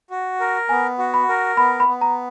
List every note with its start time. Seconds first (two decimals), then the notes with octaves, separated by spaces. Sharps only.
0.10 F#4
0.40 A#4
0.69 B3 G#5
0.98 F#4
1.14 B5
1.29 A#4
1.57 B3 B5
1.80 B5
1.87 B3
2.01 A#5